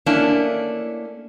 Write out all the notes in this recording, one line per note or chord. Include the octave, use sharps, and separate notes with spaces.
A3 A#3 C#4 D4 E4